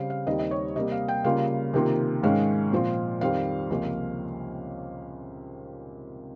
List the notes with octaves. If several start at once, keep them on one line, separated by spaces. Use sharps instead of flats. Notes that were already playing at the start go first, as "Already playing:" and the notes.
Already playing: C#3 G3 C4 F5
F5
D#2 D#3 G3 C4 D#5
D#5
C#5
C3 G3 A#3 D#5
F5
G5
C#3 G3 A#3 F4 F5
C3 D#3 A#3 F4
G#2 D#3 G#3 C#4 F5
A#2 F3 C4 F4
F2 D#3 G3 C4 F5
C#2 C3 F3 A#3 C#4